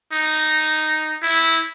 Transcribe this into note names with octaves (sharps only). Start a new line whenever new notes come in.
D#4
E4